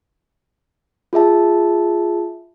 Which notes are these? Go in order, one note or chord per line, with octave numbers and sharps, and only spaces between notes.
F4 G#4 E5 A5